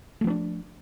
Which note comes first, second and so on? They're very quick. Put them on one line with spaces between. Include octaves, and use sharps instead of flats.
A3 F3 C4 D4